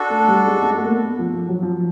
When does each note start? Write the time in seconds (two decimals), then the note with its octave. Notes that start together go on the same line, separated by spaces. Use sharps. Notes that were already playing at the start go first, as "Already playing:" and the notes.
Already playing: D4 F#4 A4
0.10 A3
0.28 G3
0.48 G#3
0.62 G#3
0.76 A3
0.85 A#3
0.90 B3
1.19 F3
1.33 F3
1.48 F#3
1.63 F3